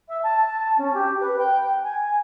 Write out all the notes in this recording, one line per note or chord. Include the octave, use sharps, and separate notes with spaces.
E5
A5
C#4
G4
B4
G5
G#5